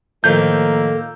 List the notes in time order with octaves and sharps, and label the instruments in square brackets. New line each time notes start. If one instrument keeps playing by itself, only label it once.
[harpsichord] A2 D#3 F3 [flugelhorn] A#3 [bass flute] A4 [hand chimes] G6